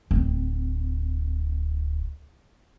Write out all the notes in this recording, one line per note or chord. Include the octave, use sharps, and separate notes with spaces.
D1 C4